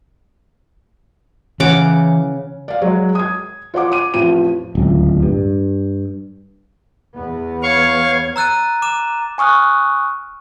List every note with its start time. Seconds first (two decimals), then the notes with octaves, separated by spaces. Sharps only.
1.60 C#3 E3 F#5 D6
2.68 D5 F5
2.82 F#3 G#3 C#5
3.15 D#6 G#6
3.74 F4 C#5 F#5 D6
3.92 D6 D#7
4.14 A1 F2 F3 D#7
4.75 D1 C#2
5.22 G2
7.14 E2 B3
7.63 C#5 F5 C#6
8.36 A#5 E6 F#6 A6 D#7
8.82 D6 E7
9.38 G#5 C#6 D#6 F6 F#6